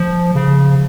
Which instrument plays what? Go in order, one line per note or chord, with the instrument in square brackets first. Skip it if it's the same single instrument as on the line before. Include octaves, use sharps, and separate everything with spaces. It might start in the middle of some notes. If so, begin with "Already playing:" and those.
Already playing: [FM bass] F3
C#3